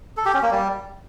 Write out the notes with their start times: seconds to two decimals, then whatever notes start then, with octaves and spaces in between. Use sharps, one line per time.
0.17 A4
0.26 G4
0.34 C#4
0.43 A#3
0.51 G3